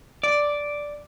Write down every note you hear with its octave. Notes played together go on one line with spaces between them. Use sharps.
D5